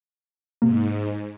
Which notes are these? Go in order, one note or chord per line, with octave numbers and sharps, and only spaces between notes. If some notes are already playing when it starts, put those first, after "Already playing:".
G#2 C3 A#3